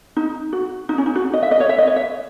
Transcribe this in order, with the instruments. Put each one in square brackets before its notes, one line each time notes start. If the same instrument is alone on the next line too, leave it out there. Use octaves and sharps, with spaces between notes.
[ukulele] D#4
F#4
D#4
C#4
D#4
F#4
D#5
E5
D#5
C#5
E5
D#5
C#5
E5